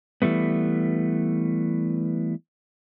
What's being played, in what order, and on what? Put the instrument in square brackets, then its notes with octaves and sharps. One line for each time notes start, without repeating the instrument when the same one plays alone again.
[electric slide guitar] E3 G3 A3 B3